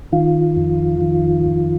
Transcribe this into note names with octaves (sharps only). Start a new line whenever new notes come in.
D#3 F4
F2
D#3
F2